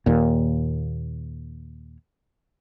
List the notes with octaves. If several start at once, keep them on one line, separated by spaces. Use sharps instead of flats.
D#2 A#2